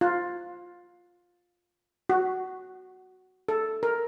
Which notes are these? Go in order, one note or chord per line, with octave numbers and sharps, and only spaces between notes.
F4
F#4
A4
A#4